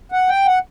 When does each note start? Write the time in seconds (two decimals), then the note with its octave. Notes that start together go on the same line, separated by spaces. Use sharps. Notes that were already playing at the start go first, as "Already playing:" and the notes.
0.12 F#5
0.29 G5
0.46 F#5